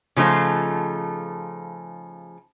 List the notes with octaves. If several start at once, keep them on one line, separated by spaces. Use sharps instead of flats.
C#3 F3 A3 D#4 F4